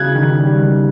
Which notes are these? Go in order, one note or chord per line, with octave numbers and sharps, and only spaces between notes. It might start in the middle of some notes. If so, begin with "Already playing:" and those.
Already playing: C#3 F#6 G#6
D#3
G3
D#3